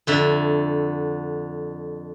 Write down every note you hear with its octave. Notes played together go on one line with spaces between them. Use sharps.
F2 D3 E5